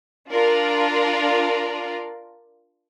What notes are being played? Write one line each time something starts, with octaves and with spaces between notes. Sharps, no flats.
D4 F4 A#4 D5